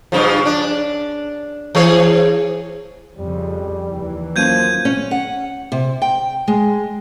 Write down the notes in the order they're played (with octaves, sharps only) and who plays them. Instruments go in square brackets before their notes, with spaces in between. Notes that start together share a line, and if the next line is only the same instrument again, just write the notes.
[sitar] G2 C#3 F3
D4
E3 G#4 C#5
[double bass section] F2 C#3 [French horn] G3
[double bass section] D#2 E3
[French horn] F3 [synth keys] F#3 A#3 C#4 [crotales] G6 G#6 D#7
[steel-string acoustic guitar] C#4
F#5
C3
G5
G#3